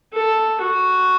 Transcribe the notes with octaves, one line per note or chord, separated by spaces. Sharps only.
A4
F#4